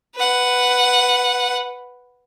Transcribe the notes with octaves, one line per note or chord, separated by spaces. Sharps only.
B4 F#5